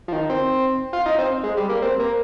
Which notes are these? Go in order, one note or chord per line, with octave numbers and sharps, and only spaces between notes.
F3
D#3
C4
F4
D#4
C4
G#3
G3
A#3
C4
A#3